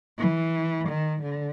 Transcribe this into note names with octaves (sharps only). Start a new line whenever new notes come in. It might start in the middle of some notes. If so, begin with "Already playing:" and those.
E3
D#3
D3